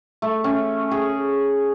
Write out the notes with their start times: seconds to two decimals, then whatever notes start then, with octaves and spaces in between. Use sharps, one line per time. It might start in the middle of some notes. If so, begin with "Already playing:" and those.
0.22 A3
0.44 C#4
0.91 G#4